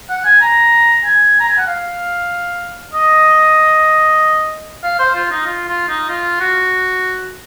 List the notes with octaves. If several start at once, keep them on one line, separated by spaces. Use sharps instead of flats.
F#5
G#5
A#5
G#5
A#5
G#5
F#5
F5
D#5
F5
C5
F4
D#4
F4
F4
D#4
F4
F#4